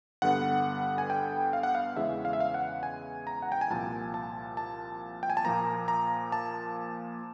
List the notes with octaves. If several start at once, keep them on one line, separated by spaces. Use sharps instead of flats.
G2 D3 G3 B3 F#5
G#5
G5
F5
F#5
F5
E2 C#3 E3 G#3 E5
F5
E5
F5
F#5
G#5
A#5
F#5
G5
G#5
C2 A#2 F3 A5
A5
A5
G5
G#5
A5
A#2 F3 A#3 A#5
A#5
A5